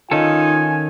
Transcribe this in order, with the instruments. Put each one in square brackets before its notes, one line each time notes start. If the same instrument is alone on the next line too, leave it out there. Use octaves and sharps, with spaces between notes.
[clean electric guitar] D#3 C#4 A4 [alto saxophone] D#4 [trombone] F4 [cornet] G#5